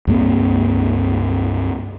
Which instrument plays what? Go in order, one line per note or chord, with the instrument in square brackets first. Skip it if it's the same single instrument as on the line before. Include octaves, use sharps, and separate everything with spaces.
[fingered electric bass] C#2 G2 A#3 C4